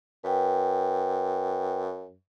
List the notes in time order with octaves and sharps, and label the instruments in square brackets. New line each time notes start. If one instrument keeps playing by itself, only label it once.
[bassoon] F#2 [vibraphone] B4 G5